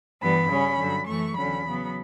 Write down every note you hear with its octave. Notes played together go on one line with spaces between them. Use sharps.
G2 E3 G3 B3 B5
C#3 G3 C#4
G2 D3 F#3
F#2 E3 A3 C#6
E2 D3 F#3 C#4 B5
C#3 F#3 B3